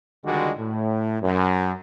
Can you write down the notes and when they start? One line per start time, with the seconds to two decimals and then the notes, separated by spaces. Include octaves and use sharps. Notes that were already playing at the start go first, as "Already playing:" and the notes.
0.24 C#2 D3 D#3 G3 G#3 F#4
0.58 A2
1.22 F#2